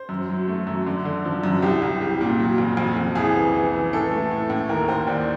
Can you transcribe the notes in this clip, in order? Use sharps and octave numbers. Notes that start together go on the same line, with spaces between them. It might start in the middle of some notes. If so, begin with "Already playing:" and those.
Already playing: C5
F#2
F#3
A3
F#2
D3
D3
F3
F#2
C2 G4
C2
G3
A#2
F#3
F2
F2
F2
C2 G#4
E3
E3
E3
A2 A4
A3
A2
A2
D#2 A#4
D#2 C5
D#2 D5